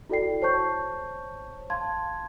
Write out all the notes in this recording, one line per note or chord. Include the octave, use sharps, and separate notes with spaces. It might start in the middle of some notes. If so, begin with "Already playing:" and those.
E4 F#4 A4 D5 G5 C7
C5 C#5 A5 C#6 G6
F5 A5 C6 G#6